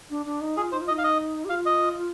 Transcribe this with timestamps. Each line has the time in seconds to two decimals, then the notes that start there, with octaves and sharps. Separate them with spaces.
0.10 D4
0.26 D4
0.41 D#4
0.57 F4 G#4
0.72 D#4 C5
0.81 F4
0.88 D#5
0.91 D#4
0.98 F5
1.04 D#5
1.45 G4
1.50 F4 F5
1.66 D#5